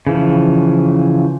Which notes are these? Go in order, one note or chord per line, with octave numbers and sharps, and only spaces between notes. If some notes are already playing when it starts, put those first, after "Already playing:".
C#3 E3 F3